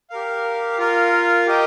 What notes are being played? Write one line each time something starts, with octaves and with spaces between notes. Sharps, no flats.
G4 A#4 F5
F4 A#4 F5
G4 A#4 D#5 G5